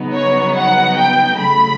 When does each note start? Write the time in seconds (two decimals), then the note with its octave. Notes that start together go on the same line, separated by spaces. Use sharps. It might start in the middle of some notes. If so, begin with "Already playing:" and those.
Already playing: C#3 F#3 B3 D#4
0.13 C#5
0.55 F#5
0.96 G5
1.38 C#3 F#3 A3 B5